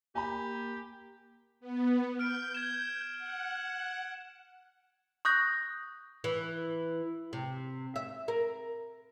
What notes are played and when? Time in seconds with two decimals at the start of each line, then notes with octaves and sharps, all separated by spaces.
0.15 A#3 G4 G#5 A#5 B5
1.60 B3
2.19 F6 G6 D7
2.54 G#6 E7
3.18 F#5
5.25 C#6 D#6 F#6 G6 A#6
6.24 E3
7.33 C3
7.96 E5
8.28 A#4